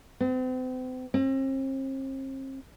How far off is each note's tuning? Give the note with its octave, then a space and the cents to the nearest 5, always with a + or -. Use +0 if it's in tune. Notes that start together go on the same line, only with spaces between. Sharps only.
C4 -40
C4 +40